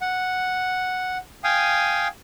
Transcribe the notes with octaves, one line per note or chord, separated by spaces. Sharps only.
F#5
F5 G5 G#5 D#6